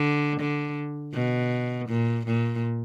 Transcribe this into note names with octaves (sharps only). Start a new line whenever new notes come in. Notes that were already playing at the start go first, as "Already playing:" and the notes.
Already playing: D3
D3
B2
A#2
A#2